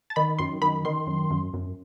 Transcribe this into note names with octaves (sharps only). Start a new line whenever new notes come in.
A5
D#3 B5
F#2 C6
D#3 B5
D#3 C6
F#2
F#2
F#2